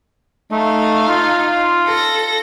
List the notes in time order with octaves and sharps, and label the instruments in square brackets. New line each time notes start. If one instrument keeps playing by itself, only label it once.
[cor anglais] A3 [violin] D#4 F5
[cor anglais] F4
[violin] A4 A#6